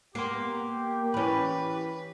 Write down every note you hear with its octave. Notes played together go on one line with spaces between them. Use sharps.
A#3 B3 G4 C6 C7
E3 C#4 E4 B4 B5